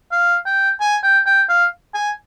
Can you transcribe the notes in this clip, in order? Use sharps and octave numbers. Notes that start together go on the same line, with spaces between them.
F5
G5
G#5
G5
G5
F5
G#5